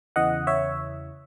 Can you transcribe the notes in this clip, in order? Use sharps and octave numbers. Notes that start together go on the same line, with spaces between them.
E2 C#3 E3 D#5 F#5
C#5 E5